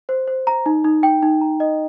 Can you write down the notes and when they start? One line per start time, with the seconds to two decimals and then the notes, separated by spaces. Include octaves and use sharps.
0.09 C5
0.28 C5
0.47 A#5
0.66 D#4
0.84 D#4
1.03 G5
1.23 D#4
1.41 A#5
1.60 D#5